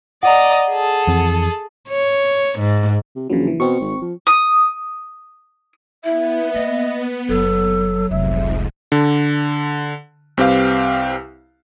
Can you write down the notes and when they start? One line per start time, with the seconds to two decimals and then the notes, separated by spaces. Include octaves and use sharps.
0.23 D5 D#5 F#5 A#5
0.70 G#4 A4
1.07 F2 E3 C4
1.90 C#5
2.59 G#2
3.16 C3
3.30 A#1 C#3 E3 F#3
3.47 E3
3.60 B2 C4 C#6
3.80 G#1
4.01 F3
4.27 D#6
6.04 B3 E4 E5
6.54 A#3 D#5
7.29 F#1 F#3 A4
8.11 F1 C2 F2 G#2 E5
8.92 D3
10.37 C2 C4 G4 B4 F5